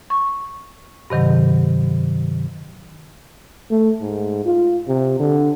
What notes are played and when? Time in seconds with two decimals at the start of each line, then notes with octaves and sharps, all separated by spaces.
0.10 C#6
1.10 G2 C3 D#3 F#3
3.71 A3
4.01 G#2
4.45 F4
4.88 C3
5.19 D3